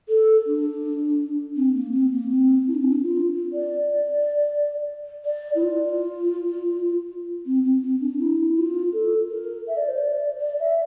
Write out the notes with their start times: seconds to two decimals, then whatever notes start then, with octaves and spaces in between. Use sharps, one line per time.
0.08 A4
0.46 D4
1.56 C4
1.74 A#3
1.92 C4
2.11 A#3
2.30 C4
2.67 E4
2.74 D4
2.83 C4
2.91 D4
3.03 F4
3.52 D5
5.24 D5
5.55 E4
5.62 F4
7.45 C4
7.64 C4
7.82 C4
8.00 D4
8.19 E4
8.56 F4
8.92 A4
9.29 A#4
9.67 E5
9.76 D5
9.88 C5
9.97 D5
10.40 D5
10.59 E5